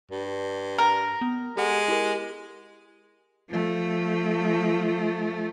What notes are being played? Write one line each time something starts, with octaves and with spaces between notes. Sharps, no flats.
G2
A#4
B3
G#3 G4 A4 F#5
E4 G4 A#4
F3 A3